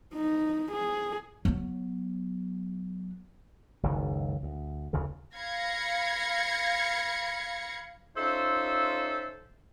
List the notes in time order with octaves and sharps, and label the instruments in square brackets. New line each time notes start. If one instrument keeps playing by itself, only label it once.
[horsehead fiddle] D#4
G#4
[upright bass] F#3 B3
[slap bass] F#1 C#2 G#2 D#3
D2
F1 D2 C#3 E3
[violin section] F5 B5 G#6 A#6 C#7
[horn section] C#4 D#4 F4 A4 C5 E5